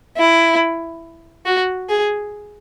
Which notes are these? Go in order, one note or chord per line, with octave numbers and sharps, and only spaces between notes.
E4
F#4
G#4